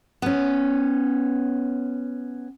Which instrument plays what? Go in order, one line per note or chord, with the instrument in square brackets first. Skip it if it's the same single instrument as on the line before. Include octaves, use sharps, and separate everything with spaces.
[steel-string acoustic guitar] B3 C#4